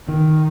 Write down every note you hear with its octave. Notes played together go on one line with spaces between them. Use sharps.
D#3